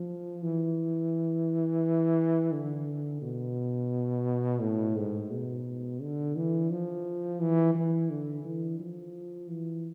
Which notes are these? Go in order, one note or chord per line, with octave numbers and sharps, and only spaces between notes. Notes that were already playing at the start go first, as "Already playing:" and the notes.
Already playing: F3
E3
D3
B2
A2
G#2
B2
D3
E3
F3
E3
E3
D3
E3
F3
E3